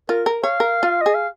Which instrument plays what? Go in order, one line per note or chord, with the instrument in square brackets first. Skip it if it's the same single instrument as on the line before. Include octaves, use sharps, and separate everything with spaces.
[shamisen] F4 [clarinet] A#4
[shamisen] A#4
[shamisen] C#5 [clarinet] F5
[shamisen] A#4
F4
[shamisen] G#4 [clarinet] D#5
[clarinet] F5